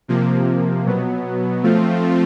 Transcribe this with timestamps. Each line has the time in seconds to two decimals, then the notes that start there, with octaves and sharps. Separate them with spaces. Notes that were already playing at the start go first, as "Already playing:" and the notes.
0.08 C3 F3 A#3
0.86 B2 F#3 B3
1.63 F3 A3 C4 F4